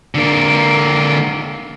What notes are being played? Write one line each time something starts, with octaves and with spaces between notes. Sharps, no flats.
D3 A#3